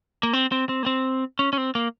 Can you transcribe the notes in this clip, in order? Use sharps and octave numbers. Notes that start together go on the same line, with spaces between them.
A#3
C4
C4
C4
A#3
C4
C#4
C#4
C4
A#3